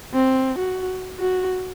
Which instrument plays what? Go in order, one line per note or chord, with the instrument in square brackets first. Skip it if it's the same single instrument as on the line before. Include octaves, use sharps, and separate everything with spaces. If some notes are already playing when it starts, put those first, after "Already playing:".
[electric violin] C4
F#4
F#4